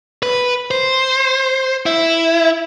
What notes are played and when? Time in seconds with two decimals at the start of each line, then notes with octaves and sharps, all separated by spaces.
0.23 B4
0.71 C5
1.86 E4